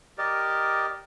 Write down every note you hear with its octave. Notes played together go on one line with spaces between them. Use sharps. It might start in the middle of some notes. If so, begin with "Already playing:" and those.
G4 A#4 D5 D#5